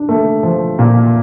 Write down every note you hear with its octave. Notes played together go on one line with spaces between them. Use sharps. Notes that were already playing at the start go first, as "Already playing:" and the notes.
Already playing: D4
A3
F3
A#2